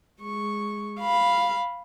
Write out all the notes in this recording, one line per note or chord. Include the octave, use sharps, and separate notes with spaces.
G#3 C#6
F5 B5